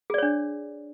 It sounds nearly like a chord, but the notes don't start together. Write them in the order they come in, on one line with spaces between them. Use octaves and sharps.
G#4 D5 C#5 D4